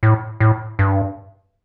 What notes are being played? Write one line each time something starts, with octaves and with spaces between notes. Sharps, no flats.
A2
A2
G2